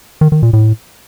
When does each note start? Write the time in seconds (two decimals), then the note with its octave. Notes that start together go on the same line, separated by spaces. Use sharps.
0.21 D#3
0.32 D#3
0.43 A#2
0.53 A2